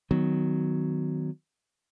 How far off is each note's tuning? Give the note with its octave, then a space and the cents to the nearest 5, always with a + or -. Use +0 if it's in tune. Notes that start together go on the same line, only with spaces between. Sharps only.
D#3 +0 F#3 +0 B3 +35